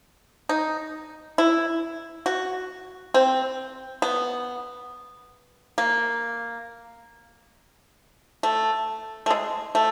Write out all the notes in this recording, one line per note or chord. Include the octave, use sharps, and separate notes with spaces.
D#4
E4
F#4
C4
B3
A#3
A3
A3
G#3
A3